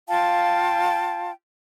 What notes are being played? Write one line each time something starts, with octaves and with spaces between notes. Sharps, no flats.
F4 F5 G5 A5